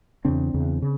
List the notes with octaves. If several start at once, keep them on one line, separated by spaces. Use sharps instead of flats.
E2 C#3 C4 D4
E2 C#3
C#3